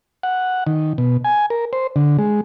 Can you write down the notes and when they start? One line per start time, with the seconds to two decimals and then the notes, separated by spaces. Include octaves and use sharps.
0.23 F#5
0.67 D#3
0.98 B2
1.25 G#5
1.50 A#4
1.73 C5
1.96 D3
2.19 G#3